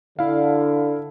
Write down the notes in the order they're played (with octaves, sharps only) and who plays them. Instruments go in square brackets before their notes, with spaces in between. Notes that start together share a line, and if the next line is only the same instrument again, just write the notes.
[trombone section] D3 [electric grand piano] E4 F5